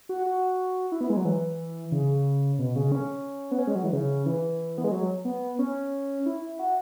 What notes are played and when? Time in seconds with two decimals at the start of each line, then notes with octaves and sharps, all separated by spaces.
0.09 F#4
0.26 F#4
0.92 E4
1.01 B3
1.10 G#3
1.17 F#3
1.25 E3
1.92 C#3
2.59 B2
2.76 C#3
2.92 C#4
3.51 B3
3.59 C#4
3.67 G#3
3.75 F#3
3.84 E3
3.93 C#3
4.26 E3
4.78 B3
4.84 G#3
4.92 F#3
5.25 B3
5.59 C#4
6.26 E4
6.59 F#4